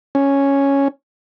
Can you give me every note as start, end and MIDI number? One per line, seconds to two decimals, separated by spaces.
0.15 0.88 61